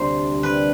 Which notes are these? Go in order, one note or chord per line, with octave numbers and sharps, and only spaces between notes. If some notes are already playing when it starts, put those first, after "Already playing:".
Already playing: D2 C3 G3 D4 C5
B4